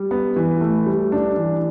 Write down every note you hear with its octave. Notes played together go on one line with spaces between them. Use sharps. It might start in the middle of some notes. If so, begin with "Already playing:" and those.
Already playing: G3
B3
E3
A3
G3
D4
E3